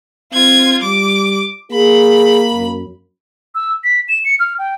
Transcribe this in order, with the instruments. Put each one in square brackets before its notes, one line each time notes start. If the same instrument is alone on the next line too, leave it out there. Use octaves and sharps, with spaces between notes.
[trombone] C4 [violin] F4 G#6
[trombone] G3 [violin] D6
[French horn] A#3 [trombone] G#4 [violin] B5
[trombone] F#2
[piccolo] E6
B6
E7
C#7
F6
G5